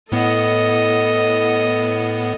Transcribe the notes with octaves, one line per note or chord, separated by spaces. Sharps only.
A2 B3 A4 D#5